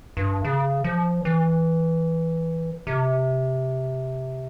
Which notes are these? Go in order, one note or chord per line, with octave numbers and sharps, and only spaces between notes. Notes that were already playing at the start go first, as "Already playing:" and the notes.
G2
C#3
F3
E3
C3